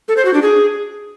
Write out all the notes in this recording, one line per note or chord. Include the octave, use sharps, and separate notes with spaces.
A4
C5
F#4
D4
G#4